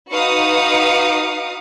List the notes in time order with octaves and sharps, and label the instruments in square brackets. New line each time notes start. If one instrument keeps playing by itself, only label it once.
[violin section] D#4 F#4 B4 F5 D#6 C#7